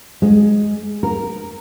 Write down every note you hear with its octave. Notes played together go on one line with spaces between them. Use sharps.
G#3
A#4